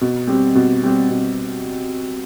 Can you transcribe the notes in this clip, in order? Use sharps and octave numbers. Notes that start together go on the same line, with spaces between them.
B2
G3 C4 G4
B2
G3 C4 G4
B2